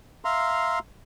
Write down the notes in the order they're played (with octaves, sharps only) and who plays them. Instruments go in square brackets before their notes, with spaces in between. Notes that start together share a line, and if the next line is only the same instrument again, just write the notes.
[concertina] E5 F5 A#5 C6